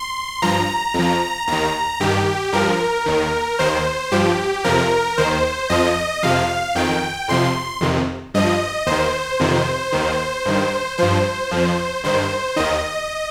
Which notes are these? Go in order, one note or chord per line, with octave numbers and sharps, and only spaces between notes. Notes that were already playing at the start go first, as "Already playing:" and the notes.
Already playing: C6
G2 F3 A#5
F2 F3
D#2 D#3 A#5
G2 D#3 G4
G2 F3 A#4
D#2 D#3
D#2 D#3 C5
G2 F3 G4
F2 C3 F3 A#4
D#2 D#3 C5
F2 F3 D#5
F2 C3 F3 F5
F2 D#3 G5
F2 C3 F3 C6
F2 C3 D#3
G2 F3 D#5
D#2 D#3 C5
F2 C3 D#3
D#2 D#3
G2 D#3
G2 F3 C5
F2 F3
G2 D#3 C5
D#2 D#3 D#5